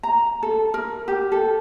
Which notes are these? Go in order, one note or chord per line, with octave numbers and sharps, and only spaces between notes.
A#5
A4
A#4
G4
A4